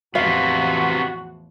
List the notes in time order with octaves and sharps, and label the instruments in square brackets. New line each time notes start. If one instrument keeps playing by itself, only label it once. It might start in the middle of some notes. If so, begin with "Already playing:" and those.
[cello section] E2 A2 F3 [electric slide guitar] C3 B3 [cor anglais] F#4 [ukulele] F5